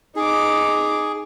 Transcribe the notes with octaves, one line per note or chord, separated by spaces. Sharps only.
D#4 G#4 D6